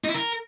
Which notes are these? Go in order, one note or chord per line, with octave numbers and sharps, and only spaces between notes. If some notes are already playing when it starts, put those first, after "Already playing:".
D#4
E4
A#4